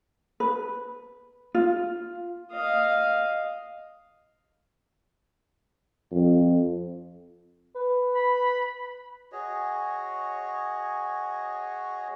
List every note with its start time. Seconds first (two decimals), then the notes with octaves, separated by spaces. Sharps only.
0.40 B4
1.55 F4
2.52 D#5 F5
6.11 F2
7.75 B4
8.15 B5
9.32 F#4 G#4 C#5 D#5